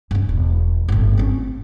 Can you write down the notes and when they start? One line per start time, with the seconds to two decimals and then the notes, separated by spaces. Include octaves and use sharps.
0.11 G2 C#4
0.29 E1
0.88 G1 A2
1.17 C4 C#4